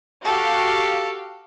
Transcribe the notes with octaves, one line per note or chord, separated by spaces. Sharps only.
F#4 G4 A4 F5